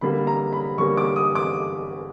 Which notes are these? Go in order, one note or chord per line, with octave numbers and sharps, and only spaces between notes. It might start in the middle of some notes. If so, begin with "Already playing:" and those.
D3 G3 A#3 B5
A#5
B5
D3 G3 A#3 C#6
D6
D#6
D6